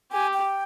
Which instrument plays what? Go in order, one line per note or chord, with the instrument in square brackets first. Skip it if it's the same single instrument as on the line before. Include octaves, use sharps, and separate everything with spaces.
[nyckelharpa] G4 [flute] G#5
[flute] G5